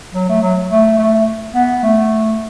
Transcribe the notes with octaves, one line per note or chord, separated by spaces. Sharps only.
F#3
A3
F#3
A3
A3
B3
A3